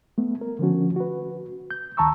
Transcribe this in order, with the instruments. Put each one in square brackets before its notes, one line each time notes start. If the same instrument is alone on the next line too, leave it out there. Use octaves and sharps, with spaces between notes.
[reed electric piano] A3 B3
A#4
D3 F3 C#4 F#4
F#4 B4
G6
D2 D#3 A5 A#5 C#6 E6